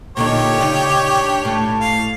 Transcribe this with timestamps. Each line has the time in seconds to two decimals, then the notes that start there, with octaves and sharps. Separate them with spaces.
0.17 A#2 D3 D#4 G4 C#5
0.61 C#3 D#4 D5
1.17 D4
1.45 A2
1.81 F5